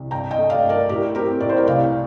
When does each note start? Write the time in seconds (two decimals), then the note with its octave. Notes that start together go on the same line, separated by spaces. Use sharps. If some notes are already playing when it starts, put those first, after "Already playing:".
Already playing: C2
0.11 G2 G5 A#5
0.31 D#5 G5
0.38 A3
0.50 D5 F5
0.63 G2
0.69 A#4 D5
0.89 A2 G4 A#4
1.15 C4 G4 A#4
1.40 A2 D5
1.49 C5
1.57 A#4 D5
1.67 C2 D5 F5